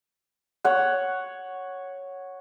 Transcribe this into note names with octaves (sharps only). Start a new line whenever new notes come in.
C#5 F#5